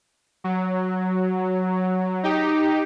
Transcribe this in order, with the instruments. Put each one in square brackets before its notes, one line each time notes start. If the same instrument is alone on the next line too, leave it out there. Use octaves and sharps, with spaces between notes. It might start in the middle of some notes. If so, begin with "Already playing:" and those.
[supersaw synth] F#3
D#4 G4